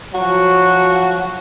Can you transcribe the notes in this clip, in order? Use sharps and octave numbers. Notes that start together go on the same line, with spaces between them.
F3 F#3 F#4